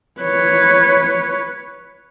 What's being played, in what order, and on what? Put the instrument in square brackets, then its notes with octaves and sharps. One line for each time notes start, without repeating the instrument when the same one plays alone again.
[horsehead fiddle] B4 C#5